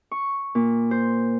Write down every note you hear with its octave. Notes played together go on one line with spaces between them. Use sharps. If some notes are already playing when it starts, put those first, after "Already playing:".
C#6
A#2
C5